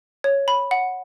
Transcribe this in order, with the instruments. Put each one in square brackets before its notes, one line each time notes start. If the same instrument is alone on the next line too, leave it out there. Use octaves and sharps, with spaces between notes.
[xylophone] C#5
B5
F#5